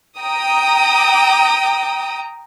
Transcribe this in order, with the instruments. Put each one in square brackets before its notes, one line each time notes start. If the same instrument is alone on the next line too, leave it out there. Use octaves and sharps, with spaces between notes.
[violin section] G5 A#5 D#6